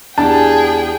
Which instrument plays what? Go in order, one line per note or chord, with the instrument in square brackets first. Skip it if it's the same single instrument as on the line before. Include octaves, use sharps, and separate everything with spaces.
[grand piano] E2 G4 [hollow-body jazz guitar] D4 [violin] G#4 G5 [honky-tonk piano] A5